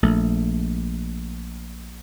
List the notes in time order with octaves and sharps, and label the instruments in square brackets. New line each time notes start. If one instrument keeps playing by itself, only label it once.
[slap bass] A#1 A3